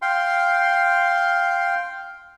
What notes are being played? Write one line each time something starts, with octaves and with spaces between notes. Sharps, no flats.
F5 G5 C6